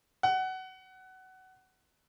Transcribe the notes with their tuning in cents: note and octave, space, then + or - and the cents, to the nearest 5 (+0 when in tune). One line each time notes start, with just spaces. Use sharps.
F#5 +20